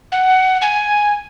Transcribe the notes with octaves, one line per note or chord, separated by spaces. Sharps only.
F#5
G#5